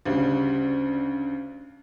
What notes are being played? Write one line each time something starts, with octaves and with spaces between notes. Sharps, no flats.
D2 C#3 G3